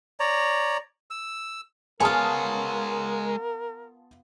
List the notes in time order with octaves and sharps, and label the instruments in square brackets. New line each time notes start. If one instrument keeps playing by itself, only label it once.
[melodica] C#5 D5 A#5
E6
[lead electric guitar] G#3 C#5 [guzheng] B3 F4 [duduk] A#4 [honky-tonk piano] G#5 A5 D#6